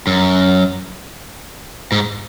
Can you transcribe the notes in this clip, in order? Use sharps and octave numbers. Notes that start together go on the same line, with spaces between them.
F#2
G#2